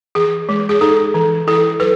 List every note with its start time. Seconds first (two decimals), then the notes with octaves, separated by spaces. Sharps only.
0.15 E3 G#4
0.49 G#3
0.69 G#4
0.81 D#4 A4
1.14 E3
1.47 E4 A4
1.80 F#3 B4